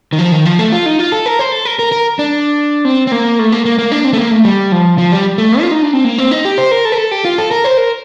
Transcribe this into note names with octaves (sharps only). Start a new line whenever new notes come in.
D#3
F3
D#3
F3
A3
F4
D#4
F4
A4
A#4
C5
A4
A#4
A#4
A#4
D4
C4
C4
A#3
A3
A#3
A#3
A#3
D4
C4
A3
A#3
A3
G3
F3
F3
G3
A3
F4
D#4
D4
C4
A#3
C4
D#4
G4
C5
A#4
A4
A#4
A4
G4
F4
A4
A#4
C5
A#4